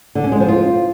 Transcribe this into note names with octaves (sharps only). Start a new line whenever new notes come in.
D3
C#4
G#3
F3
F4